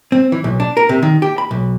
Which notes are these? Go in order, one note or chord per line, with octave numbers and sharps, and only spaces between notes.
C4
E3
B1
D4
A#4
C3
D#3
G4
B5
B1